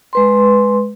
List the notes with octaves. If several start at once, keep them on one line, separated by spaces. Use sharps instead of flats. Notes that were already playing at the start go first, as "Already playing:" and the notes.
G#3 B4 C6